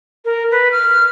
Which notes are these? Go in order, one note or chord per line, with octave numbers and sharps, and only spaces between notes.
A#4
B4
F6